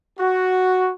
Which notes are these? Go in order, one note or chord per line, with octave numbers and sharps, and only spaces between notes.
F#4